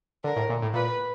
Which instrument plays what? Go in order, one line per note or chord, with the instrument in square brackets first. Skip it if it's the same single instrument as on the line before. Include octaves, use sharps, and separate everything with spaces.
[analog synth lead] D3 [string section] A#4
[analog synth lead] A2
A#2
A2
[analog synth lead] A#2 [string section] B4